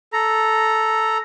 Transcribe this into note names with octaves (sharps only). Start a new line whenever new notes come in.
A4 A#5